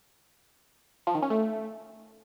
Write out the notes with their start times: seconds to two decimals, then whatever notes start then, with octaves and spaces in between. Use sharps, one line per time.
1.07 F3
1.15 D#3
1.22 C#4
1.30 A3